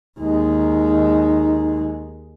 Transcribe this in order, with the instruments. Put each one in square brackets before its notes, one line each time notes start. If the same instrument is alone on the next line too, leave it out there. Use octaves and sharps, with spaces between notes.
[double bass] D#2 G#3 [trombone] D#4